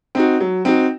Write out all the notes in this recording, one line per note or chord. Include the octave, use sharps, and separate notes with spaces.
C4 D#4 F#4
F#3
C4 D#4 F#4